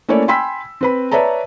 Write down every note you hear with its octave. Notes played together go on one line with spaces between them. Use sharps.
A3 A#3 C#4 E4 C#5 D5
G5 G#5 B5 C6 E6 B6
C4 B4 B5
B4 C#5 D5 E5 A5 A#5